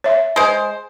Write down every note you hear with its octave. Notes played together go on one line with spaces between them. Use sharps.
C#5 E5
G#3 C5